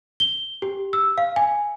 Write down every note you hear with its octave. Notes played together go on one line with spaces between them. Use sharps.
G7
G4
E6
F5
G#5